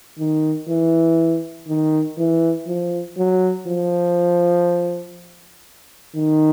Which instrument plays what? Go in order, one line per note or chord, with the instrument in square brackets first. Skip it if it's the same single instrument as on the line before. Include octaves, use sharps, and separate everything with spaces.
[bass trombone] D#3
E3
D#3
E3
F3
F#3
F3
D#3